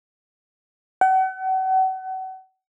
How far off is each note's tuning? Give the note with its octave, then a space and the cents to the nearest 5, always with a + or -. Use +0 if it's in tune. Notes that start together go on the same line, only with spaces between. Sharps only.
F#5 +35